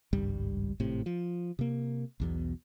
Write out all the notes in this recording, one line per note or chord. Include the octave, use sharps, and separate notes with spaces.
G#1 C#2 G2 G3
G#1 A2 C3
F3
C3 A#3
B1 E2 B2